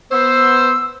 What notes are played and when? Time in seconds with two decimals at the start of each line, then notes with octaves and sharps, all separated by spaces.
0.11 B3 C5 E6